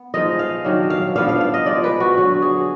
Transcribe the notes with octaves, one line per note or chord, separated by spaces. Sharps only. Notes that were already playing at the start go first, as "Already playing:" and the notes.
Already playing: B3
F3 G#3 D#4 D#5
F5
D#3 F#3 D4
F5
F3 B3 D4 F5
F5
F5
D#5
F3 G#3 D#4 D5
B4
F#4
D3 F#3 D4 F#4
G#4